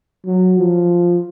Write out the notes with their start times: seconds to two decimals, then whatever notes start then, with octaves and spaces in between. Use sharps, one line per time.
0.25 F#3
0.59 F3